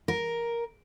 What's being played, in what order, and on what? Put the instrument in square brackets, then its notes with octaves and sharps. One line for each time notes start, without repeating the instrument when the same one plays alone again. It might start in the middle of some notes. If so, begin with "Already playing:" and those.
[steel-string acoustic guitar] A#4